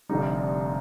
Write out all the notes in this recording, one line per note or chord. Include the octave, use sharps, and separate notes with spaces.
F1 F2 D3 G3 D#4
D4